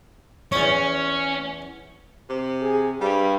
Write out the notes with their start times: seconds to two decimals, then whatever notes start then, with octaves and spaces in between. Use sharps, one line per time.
0.52 E2 C#4 C#5
2.30 C3
2.62 G#4
3.01 G2 G3